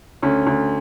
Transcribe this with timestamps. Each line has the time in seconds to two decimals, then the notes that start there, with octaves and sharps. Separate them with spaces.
0.23 D2 C#4
0.46 D2